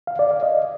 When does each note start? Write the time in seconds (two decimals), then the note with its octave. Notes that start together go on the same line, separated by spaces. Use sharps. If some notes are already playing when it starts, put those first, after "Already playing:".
0.07 F5
0.19 D5
0.31 F5
0.43 D#5